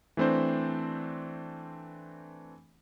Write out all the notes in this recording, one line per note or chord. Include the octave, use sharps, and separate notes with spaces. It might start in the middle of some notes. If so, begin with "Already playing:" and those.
E3 A3 C4 D4 C5